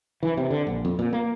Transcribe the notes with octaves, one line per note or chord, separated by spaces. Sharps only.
E3
C3
D3
A#1
F2
A#2
A#3